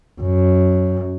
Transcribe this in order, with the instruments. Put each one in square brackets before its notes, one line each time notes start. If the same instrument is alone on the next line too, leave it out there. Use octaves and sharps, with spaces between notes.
[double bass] F#2